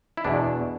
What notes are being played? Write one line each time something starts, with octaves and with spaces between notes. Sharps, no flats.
E4
E2 B2 D4